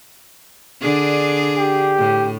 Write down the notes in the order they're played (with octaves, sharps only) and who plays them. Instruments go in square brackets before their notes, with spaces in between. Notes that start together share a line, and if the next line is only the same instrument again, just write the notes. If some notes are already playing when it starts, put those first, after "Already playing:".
[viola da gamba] D3 D4 G#4
[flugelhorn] G4
[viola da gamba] A2